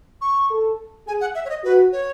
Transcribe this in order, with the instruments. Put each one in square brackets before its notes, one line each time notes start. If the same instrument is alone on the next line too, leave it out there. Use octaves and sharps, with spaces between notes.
[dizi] C#6
[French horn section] A4
[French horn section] G#4 [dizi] G#5
[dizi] F#5
E5
C#5
D#5
[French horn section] F#4 [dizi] B4
[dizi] C#5